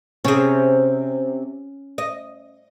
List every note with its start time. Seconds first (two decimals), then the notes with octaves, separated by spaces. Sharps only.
0.25 C3 C#4 G#4
1.98 D#5